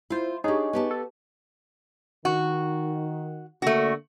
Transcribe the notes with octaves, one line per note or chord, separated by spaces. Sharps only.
E4 F4 C5 F5
D4 D#4 G4 G#4 C#5 D#5 C#6
B3 G4 A5
A4
D#3 F#4
D3 A3 A#3 D4 F#4